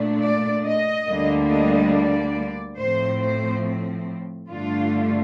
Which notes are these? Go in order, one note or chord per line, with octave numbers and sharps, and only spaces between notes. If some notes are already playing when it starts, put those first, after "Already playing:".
Already playing: A#2 A3 D4
D5
D#5
D2 D3 G3 A#3 D4
D#5
D5
A2 F3 C4 C5
C5
G2 D3 A3 D4 F4